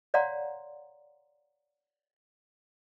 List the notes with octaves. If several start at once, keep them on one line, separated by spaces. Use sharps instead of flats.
C#5 D5 F5 F#5 A#5 C6